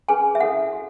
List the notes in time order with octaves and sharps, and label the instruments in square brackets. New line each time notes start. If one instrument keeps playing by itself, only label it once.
[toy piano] C#4 G#4 B4 G#5
E5
C#4 E4 A4 F#5
F#4